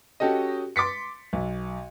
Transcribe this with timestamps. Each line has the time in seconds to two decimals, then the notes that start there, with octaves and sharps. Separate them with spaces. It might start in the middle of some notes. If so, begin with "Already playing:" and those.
0.20 C#4 F#4 G4 A4 D#5
0.76 C6 D6 A6 B6 C#7
1.33 B1